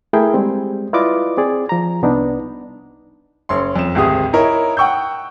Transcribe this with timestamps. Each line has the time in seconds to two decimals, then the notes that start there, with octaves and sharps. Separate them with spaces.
0.13 A3 E4 G#4 A#4 E5 G5
0.34 G3 G#3 C4
0.93 E4 F4 B4 D5 D#5 D6
1.37 C4 G#4 D5
1.69 F3 A#5
2.02 C2 B3 D4 D#4
3.49 F#1 C#5 C6
3.76 F2 E7
3.95 G#1 D2 C4 G4 G#4 D#6
4.33 D#4 E4 A#4 C#5
4.77 F#5 G5 C#6 E6 G6